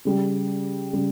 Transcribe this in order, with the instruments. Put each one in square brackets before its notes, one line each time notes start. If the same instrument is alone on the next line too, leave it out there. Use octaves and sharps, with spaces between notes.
[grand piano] C#3 G3
C#3 G3